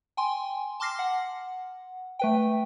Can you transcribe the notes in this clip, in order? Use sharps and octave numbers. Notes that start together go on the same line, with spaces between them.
G5 G#5 C6
A5 C6 D6 F6 A#6 C7
F#5
A3 B4 G5